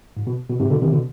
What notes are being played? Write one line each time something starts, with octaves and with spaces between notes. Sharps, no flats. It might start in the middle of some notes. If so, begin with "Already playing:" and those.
G#2
B2
B2
G#2 C3
B2 D3
C3 D#3
B2 D3